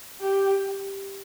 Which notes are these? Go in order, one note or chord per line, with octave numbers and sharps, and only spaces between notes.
G4